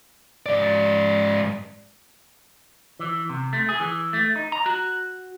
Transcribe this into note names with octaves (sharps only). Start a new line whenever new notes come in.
G#2 D5
E3
C3
A3
G#4
E3
A3
D#4
A#5
F#4